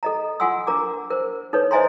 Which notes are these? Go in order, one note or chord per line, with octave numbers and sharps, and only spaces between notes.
A4 D#5 A#5
F4 A4 F#5 G#5 C6 E6
D4 A#4 A#5 D6
A#4 C5
D#4 A4 B4 C#5
C5 D#5 E5 G#5 A#5 C6